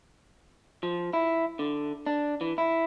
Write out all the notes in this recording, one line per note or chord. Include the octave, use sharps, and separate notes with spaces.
F3
E4
D3
D4
E3
E4